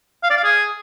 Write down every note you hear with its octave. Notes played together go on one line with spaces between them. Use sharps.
F5
D5
F5
G#4